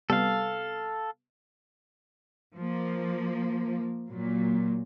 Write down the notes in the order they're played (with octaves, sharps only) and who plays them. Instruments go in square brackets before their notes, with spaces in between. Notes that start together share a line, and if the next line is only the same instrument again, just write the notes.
[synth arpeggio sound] C3 G3 B3 [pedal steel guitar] A4 F5
[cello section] F3 A#3
A#2 F#3